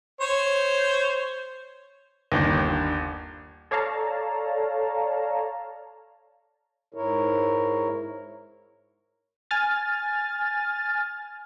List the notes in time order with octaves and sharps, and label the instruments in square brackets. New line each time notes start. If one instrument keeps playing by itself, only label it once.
[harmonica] C5 C#5
[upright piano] G1 D#2
[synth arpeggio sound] A4 C#5 D5 F5 A5 A#5
[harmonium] G#2 E4 A#4 C#5
[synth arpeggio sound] G#5 F6 A6